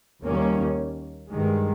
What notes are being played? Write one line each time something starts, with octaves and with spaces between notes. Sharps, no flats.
D#2 D#3 G3 A#3 C#4
G2 D#3 G#3